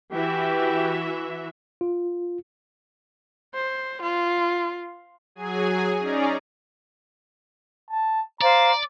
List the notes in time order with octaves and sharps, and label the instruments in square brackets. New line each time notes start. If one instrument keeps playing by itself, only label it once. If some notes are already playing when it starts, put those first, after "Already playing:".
[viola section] E3 F#4 E5 [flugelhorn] G4
[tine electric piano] F4
[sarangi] C5
F4
[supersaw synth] F#3 G#4 G#5
C#4 D#4 G#4 D5 A#5
[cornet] A5
[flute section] C5 F5 [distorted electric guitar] D5 [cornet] A#5